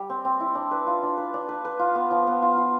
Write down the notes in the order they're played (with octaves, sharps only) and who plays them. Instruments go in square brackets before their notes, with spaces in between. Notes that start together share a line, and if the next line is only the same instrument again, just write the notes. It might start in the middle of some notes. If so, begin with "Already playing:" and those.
Already playing: [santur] G3
C4
C4
E4
D4
B4
F4
D4
B4
D4
B4
B4
F4
B3
F3
B3
F4
F4